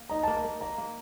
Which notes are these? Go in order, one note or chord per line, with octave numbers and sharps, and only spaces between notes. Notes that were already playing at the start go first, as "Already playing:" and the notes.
Already playing: A#3
D#4 A#5
A#3 A5
A#5
A#3
A#3 A#5
A#3